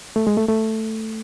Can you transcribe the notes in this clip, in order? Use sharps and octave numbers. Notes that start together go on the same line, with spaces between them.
A3
G#3
A3
A3